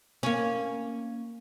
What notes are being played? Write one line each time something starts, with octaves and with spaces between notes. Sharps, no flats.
A#3 C#4